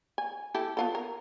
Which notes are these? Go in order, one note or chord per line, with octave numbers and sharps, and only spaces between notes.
G#5
E4 G4 A4
B3 F4 A4
A#4